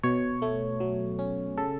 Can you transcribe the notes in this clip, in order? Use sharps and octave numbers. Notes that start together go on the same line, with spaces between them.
B2 C#5
A3
F#3
C#4
C#3 A4